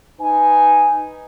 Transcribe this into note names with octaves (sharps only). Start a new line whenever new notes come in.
D#4 B4 G#5